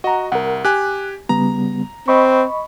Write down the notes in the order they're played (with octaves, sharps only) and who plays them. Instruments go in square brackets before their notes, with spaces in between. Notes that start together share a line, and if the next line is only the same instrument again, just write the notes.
[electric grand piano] F#4 D#5 [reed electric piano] F#5 A#5
[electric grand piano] C2 [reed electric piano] A#4 F#5
[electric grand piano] G4 G#5 [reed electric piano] F#6
[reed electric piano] C#3 G3 B3 [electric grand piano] A#5
[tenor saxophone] C4 [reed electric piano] D#5 B5 C#6